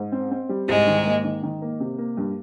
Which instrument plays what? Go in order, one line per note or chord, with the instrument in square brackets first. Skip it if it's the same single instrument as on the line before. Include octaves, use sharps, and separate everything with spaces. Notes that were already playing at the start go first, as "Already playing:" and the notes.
Already playing: [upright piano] G#2
C4
C4
G3
[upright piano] C2 [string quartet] G#2 G#3
[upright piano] D#3
A#3
D#3
D#3
A#3
C3
A#3
G2